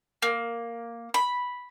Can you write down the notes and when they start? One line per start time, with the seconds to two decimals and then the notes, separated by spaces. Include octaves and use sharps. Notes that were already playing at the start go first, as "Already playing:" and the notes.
0.22 A#3
1.14 B5